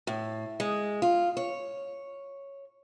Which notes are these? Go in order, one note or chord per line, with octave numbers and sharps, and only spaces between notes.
A2
G#3
F4
C#5